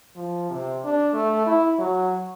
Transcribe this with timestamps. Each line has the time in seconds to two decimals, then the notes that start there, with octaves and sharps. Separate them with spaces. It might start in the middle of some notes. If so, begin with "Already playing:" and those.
0.16 F3
0.51 C3
0.85 D4
1.14 A3
1.46 E4
1.79 F#3